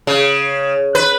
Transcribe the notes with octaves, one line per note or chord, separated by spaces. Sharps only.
C#3
B4